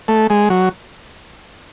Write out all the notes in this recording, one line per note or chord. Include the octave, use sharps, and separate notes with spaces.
A3
G#3
F#3